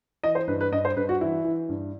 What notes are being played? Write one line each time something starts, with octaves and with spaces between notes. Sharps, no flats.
E3 D#5
C5
G2 B4
B4
G2 D#5
C5
G2 B4
F#4
E3 E4
E3
G2